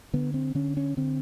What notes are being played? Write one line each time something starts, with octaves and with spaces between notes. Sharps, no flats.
D3 B3
C4
D3 C#4
C#4
D3 C4